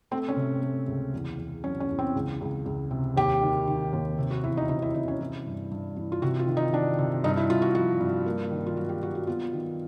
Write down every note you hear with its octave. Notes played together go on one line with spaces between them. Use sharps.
A3 C4
C#4
C3
A3
C#2
E2
E2
F#3 C#4
C#4
E2
C4
C#2
C#2
C#2
C3
D#2 G4
D#3
D#3
D#2
C3
F#4
E2 E4
D#4
C3 D#4
E4
C3 D#4
C#4
E3 E4
G2
G2
E3
F4
C3 F#4
F4
D#3
D#4
D#3 D4
C3
G2 D#4
E4
G2 F4
F#4
F3 F#4
G2
A#3
D#3
F4
F#3 F#4
G4
F#3 F#4
F#4
B3 F4
D#3